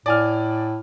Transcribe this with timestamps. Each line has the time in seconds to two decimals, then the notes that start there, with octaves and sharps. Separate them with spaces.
0.06 A2 D5 G#5 F6